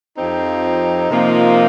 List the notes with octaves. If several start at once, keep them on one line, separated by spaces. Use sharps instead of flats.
F2 F3 C4 D#4 G4
C3 F3 A#3 F4